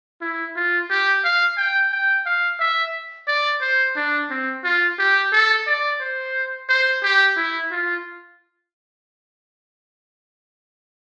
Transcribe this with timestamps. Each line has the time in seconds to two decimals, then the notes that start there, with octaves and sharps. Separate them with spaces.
0.21 E4
0.56 F4
0.90 G4
1.24 F5
1.58 G5
1.92 G5
2.26 F5
2.60 E5
3.28 D5
3.62 C5
3.96 D4
4.30 C4
4.64 F4
4.99 G4
5.33 A4
5.67 D5
6.01 C5
6.69 C5
7.03 G4
7.37 E4
7.72 F4